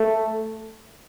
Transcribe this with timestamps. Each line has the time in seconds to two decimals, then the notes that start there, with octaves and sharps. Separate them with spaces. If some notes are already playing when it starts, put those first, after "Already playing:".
Already playing: A3